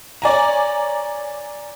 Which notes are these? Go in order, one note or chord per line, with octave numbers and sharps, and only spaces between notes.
C#5 D5 G#5 A#5